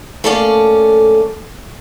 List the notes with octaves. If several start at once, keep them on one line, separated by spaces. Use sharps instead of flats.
A3 A#3 C#4 A4 D5 F5